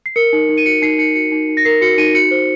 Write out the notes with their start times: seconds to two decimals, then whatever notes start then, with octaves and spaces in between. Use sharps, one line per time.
0.06 C7
0.16 A#4 C#7
0.33 D#4
0.49 D#4
0.58 D#7
0.66 F#4 C#7
0.82 D#4 C7
0.99 D#4 C#7
1.15 F#4 C#7
1.32 D#4
1.49 D#4
1.57 A#6
1.65 A#4 C7
1.81 F#4 C#7
1.98 D#4 D#7
2.15 F#4 C#7
2.31 C5